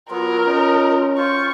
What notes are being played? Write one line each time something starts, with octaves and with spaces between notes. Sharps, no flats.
F#3 B3 F4 A#4
C#4 D#4
F4 C5 C#6